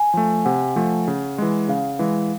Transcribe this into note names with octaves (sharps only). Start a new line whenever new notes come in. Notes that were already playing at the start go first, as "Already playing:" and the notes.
Already playing: G#5
F3 A3
C3 F#5
F3 A3
C#3
E3 G#3
C#3 F5
E3 G#3